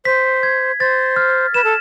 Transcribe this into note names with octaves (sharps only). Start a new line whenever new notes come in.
C5 B6
G#6
C5 A6
F6
B4 E7
A4